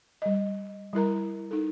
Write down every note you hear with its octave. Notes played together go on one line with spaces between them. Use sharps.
G3 D#5
G3 E4 A#4 A#5
D#4 A4